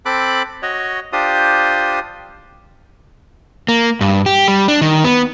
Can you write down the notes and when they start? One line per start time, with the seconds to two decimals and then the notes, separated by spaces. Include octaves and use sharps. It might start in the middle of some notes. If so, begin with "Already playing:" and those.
0.06 C4 A4 B5 D6 F#6
0.63 F#4 C#5 D#5
1.13 D4 F4 G4 C5 D#6
3.68 A#3
4.01 G2
4.26 G4
4.48 G3
4.68 D4
4.81 D#3
5.04 B3